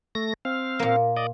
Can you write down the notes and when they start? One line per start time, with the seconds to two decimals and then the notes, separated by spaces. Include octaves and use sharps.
0.15 A3 A#6
0.45 C4 F5
0.79 A#2 A#3
1.17 D5 D#5